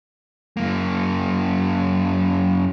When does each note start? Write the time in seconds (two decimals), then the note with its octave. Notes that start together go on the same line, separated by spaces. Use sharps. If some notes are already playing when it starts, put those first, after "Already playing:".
0.57 F#2 A#3